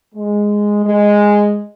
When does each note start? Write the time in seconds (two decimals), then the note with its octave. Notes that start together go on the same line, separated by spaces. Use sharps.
0.15 G#3
0.85 G#3